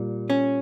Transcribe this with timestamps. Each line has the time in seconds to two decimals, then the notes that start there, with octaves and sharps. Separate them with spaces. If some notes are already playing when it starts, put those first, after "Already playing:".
Already playing: A#2 G3
0.30 C#4